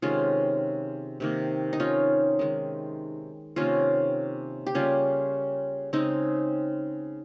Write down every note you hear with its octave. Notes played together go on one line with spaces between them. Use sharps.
C3 D#3 G#3 C#4 F4
C3 D#3 A#3
D#4
C#4 F4
D#3 G#3
C3 D#3 A#3 C#4 F4
G4
C#3 G3 A#3 C#4 F4
C#3 G#3 C4 D#4